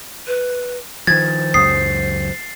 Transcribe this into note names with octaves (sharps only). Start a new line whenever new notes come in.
B4
D#3 F3 C5 G#6 A6
C#2 F#2 F#3 D#6 C7